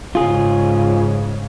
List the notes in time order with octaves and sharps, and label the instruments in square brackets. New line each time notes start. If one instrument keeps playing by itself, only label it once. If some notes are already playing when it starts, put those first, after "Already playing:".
[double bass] G#2 C#3 [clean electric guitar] F4 G#4